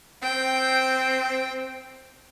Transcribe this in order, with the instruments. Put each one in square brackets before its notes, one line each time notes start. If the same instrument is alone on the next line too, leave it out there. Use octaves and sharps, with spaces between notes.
[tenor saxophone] C4 [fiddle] G5